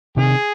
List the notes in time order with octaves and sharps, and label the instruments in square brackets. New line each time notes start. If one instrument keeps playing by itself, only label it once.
[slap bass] C3 D#3 [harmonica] G#4